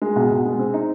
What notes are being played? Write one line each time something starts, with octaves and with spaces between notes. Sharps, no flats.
G#3
B2
B2
G#3
C4
D#4